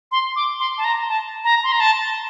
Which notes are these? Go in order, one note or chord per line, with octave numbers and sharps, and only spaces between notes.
C6
D6
C6
A5
A#5
A5
A#5
C6
A#5
A5